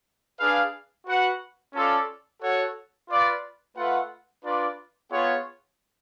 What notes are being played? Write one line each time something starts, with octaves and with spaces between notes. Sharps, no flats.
D4 G#4 B4 F5
F#4 B4 F#5
C#4 F4 A4 D5 F5
F#4 A4 C#5 F#5
F4 B4 D5 F5
A3 F4 B4 F#5
D4 F4 B4 D5
B3 F4 G#4 C#5 F#5